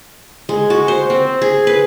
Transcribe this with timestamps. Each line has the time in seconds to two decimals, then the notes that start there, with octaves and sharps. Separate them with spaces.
0.49 G#3
0.70 F#4
0.88 C5
1.10 C4
1.42 G#4
1.67 B4